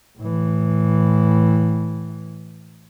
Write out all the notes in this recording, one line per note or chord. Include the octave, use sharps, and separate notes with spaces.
A2 E3